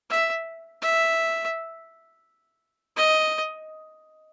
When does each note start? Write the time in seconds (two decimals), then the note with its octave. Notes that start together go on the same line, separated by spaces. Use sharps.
0.10 E5
0.82 E5
2.96 D#5